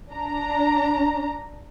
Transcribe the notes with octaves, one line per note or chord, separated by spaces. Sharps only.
D4 A#5